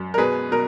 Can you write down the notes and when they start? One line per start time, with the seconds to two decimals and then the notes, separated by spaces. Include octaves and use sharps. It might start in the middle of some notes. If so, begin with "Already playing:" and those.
Already playing: F#2
0.14 A#4
0.18 B2 G#4 B4
0.51 B2 A#4